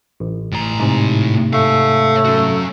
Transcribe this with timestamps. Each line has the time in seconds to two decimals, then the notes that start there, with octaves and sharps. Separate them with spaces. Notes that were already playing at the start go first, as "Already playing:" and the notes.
0.20 A1
0.52 A2 A#5
0.80 G#2 C3
1.53 A3 C#5 F5
2.25 C#4 F#4